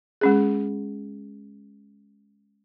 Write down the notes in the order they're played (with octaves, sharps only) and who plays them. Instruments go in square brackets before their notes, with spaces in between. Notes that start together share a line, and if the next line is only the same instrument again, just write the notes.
[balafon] G#3 C#4 G#4